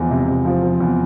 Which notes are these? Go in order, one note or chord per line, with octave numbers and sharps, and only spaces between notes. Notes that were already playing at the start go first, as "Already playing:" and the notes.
Already playing: E2 F3 G#3 C5
C3
C3
F3
F3
E2